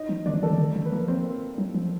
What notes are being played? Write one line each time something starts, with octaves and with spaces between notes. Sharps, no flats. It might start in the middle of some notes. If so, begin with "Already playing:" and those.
Already playing: D#4 D#5
F3
D#3 D4 D5
F3
E3 A3 A4
D#3
D3
D#3
B4
F3 A#3 A#4
C4 C5
F#3
F3